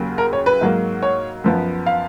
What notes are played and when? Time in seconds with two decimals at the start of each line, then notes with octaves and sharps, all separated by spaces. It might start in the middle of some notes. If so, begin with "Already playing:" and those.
Already playing: D#2 C#3 F#3 A#3
0.18 A#4
0.33 C#5
0.46 B4
0.61 G#2 F#3 A#3
1.03 C#5
1.44 F#2 F3 B3
1.86 F5